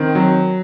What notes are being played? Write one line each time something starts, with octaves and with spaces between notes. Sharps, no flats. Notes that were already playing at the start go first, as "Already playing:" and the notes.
Already playing: D#3 C4
F#3